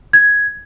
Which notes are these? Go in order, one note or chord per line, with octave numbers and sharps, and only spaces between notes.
G#6